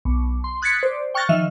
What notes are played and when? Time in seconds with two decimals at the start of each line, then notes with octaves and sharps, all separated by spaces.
0.05 B1
0.44 C6
0.62 D#6 F#6 G#6 A6 B6 C#7
0.83 C5 D5
1.14 G5 C#6 F6 F#6 A6 A#6
1.29 D#3 F3 E5 F6